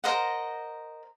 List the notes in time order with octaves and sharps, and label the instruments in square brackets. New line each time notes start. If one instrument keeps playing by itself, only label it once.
[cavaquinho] A#4 C5 D#5 F#5